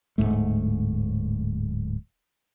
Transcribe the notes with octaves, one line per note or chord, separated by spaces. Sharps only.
D1 G#1 G#2 A3